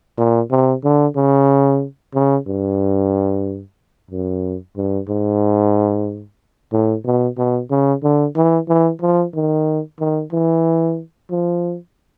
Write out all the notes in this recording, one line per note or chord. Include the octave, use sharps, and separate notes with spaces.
A#2
C3
D3
C#3
C#3
G2
F#2
G2
G#2
A2
B2
B2
C#3
D3
E3
E3
F3
D#3
D#3
E3
F3